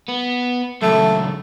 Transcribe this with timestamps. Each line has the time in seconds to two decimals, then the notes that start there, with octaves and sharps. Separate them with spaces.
0.09 B3
0.82 C#2 F#2 A3